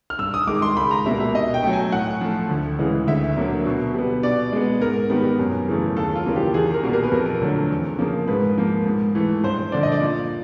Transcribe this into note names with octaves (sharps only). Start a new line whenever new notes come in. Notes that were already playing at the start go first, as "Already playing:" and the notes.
F6
G2 E6
D#6
D#3 G#3 D6
C6
C#2 B5
A#5
B2 G3 A#3 E5
E5
B2 D#5
G5
F#3 A3
G#5
A2 F#5
F3 A3
D2
C#3 E3 G#3
D2 E5
D3 F#3 A#3
B2
G3 B3
B2 D5
G#3 B3
G#2 A#4
D#3 G3 B3
F#2
C#3 E3 A3
D#2 A4
F4
C#3 E3 G3 A#3
G4
E2 G#4
A#4
B2 G3 A#3
A#4
B4
F2 A#4
D3 F#3 A3
E2
C#3 F3 A#3
G#2 B4
F3 A#3
G#2
E3 A3
G2 C5
D3 F3 D5
D#5
D5
A#2